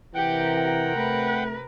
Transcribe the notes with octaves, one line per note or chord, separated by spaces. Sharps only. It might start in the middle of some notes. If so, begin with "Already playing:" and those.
C3 E3 G4 A#4 F#5 G5
A3 B4